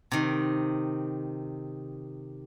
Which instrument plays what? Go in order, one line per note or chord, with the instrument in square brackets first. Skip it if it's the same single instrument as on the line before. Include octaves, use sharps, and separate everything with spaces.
[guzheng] C3 D#3